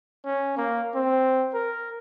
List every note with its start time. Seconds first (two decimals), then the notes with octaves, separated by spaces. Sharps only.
0.25 C#4
0.57 A#3
0.95 C4
1.54 A#4